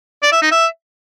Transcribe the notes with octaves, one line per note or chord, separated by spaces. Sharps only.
D5
E5
D#4
E5